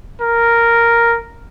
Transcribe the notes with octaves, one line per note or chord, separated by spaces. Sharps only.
A#4